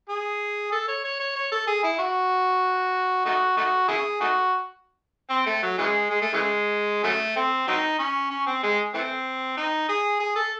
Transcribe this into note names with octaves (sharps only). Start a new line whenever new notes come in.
G#4
A4
C#5
C#5
C#5
C#5
A4
G#4
E4
F#4
A3 D#4 F#4
A3 D#4 F#4
C#4 E4 G#4
A3 D#4 F#4
C4
A3
F#3
C#3 E3 G#3
G#3
A3
C#3 E3 G#3
C#3 F#3 A3
C4
F#3 C4 D#4
C#4
C#4
C4
G#3
E3 A3 C4
D#4
G#4
G#4
A4